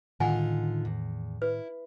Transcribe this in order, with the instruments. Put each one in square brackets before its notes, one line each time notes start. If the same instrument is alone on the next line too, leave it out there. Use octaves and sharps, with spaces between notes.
[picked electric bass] A2 D#3 [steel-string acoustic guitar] D3 D#4 F4 [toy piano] F#5 G#5
[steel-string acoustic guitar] E2
[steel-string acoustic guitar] E4 [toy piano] B4